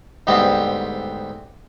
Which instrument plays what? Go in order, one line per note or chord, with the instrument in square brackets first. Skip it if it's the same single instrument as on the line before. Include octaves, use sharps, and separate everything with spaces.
[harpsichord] D2 G#2 G3 B3 C4